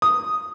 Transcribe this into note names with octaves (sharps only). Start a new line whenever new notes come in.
D#6